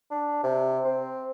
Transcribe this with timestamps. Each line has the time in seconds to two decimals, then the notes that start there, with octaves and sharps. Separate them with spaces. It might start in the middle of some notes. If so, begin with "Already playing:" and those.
0.11 D4
0.43 C3
0.85 C4